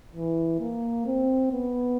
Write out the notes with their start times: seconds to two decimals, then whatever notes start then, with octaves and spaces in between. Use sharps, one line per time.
0.14 E3
0.60 A#3
1.06 C4
1.52 B3